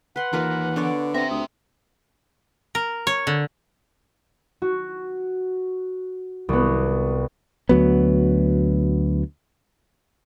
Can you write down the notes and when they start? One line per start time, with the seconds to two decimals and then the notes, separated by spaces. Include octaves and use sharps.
0.16 B4 F#5 C6
0.33 D#2 E3 F4 A#4 B4
0.76 D3 B3 C#5 D5
1.14 C4 G4 E5 A#6
1.31 D2 D#6
2.75 A#4
3.07 C#5
3.27 D3
4.62 F#4
6.49 C2 B3
7.69 D2 F#3 B3